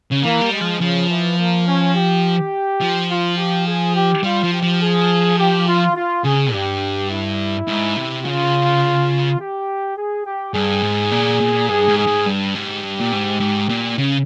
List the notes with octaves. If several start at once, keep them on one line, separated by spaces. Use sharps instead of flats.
C#3
E3 A#3
G3
G#3
F3
C#3 F3
E3
A#3
C#4
G4
F3
F4
G4
G#4
G4
G3 F4
F3
G4
F3
G#4
G4
F4
F4
C#3 G#4
G2 G4
E4
G#2
C3
C#3 F4
G4
G#4
G4
G2 G#4
G#2
A#2
A#2
G2 G#4
G#2
G#4
G#2
G2
G#2 G4
G2
A#2
G#2
G#2
A#2
C#3